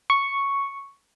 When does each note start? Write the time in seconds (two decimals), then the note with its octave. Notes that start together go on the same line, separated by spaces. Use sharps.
0.10 C#6